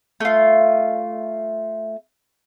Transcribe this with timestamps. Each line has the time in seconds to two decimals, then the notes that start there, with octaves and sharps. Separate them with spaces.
0.20 A3 F4